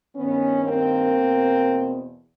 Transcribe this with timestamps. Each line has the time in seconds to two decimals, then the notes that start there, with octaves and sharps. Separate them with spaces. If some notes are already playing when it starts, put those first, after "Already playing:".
0.16 G2 D#3 B3 C#4
0.65 A#3 C4
1.15 E2 B2